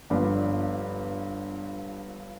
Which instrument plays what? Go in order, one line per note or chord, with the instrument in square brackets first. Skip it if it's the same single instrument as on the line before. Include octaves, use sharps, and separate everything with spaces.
[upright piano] G1 G2 F3 B3 D4